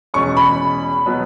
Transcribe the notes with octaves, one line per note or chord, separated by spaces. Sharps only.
E2 B2 G#3 C#4 C#6
B5
B2 F#3 B3